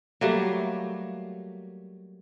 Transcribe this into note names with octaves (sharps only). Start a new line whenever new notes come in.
F#3 G3 A3 A#3